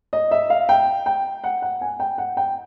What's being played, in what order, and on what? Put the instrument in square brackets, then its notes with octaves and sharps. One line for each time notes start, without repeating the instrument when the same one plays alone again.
[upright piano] D#5
E5
F5
G5
G5
F#5
F#5
G#5
G5
F#5
G5